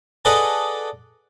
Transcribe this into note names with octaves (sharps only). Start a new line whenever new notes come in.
G#4 A4 B4 D5 D#5 F#5